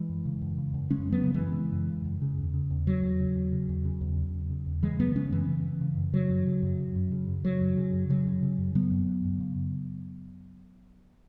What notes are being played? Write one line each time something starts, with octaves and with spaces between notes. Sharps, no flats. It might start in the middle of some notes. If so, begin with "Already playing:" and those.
Already playing: E3 G#3
F#2
C#3
F#2
C#3
F#2
C#3 G#3 C#4
F#2
F#3 B3
C#3
E3 G#3
F#2
C#3
F#2
C#3
F#2
C#3
E2
C#3
E2
C#3 F#3
E2
C#3
E2
C#3
E2
C#3
E2
C#3
E2
C#3
E2
C#3 E3 G#3
F#2 F#3 B3
C#3 G#3 C#4
F#2 E3
C#3
F#2
C#3
F#2
C#3 F#3
F#2
C#3
F#2
C#3
F#2
C#3
F#2
C#3 F#3
F#2
C#3
F#2
C#3 F#3
F#2
C#3
F#2
C#3 F#3 B3
F#2
C#3
F#2
C#3